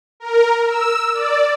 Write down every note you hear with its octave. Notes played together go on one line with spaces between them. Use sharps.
A#4
E6
D5